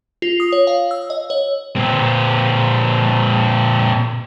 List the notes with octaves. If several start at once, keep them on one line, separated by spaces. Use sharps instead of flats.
F4
D#6
C#5
F5
E6
D#5
C#5
A#2 C4